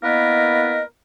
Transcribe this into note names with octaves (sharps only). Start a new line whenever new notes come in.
A#3 B3 E4 A#4 B4 D#5